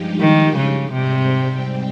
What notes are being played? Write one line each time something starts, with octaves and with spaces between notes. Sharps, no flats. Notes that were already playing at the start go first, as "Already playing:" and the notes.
Already playing: G2 F3 G#3 D#4 G4
D#3
C#3
G#2 C3 G3 C4 G4